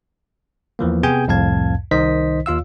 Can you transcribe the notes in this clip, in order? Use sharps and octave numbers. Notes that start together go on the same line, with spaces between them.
E2 E3 F3 A#3
C3 B3 G#4 G5 G#5 G6
C2 F2 A2 F5 A5 G#6
C2 D#3 D#4 C5 D#5 B6
D#2 F4 F5 E6